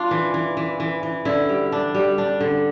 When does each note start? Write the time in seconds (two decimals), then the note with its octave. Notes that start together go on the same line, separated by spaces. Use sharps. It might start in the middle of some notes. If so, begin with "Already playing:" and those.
Already playing: D4 F4
0.11 E3
0.34 E3
0.57 E3
0.80 E3
1.03 E3
1.25 D3 E4
1.49 G3
1.72 D4
1.95 G3
2.18 D4
2.40 D3